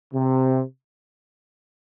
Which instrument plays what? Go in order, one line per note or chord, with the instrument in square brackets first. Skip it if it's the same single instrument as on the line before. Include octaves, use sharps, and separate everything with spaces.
[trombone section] C3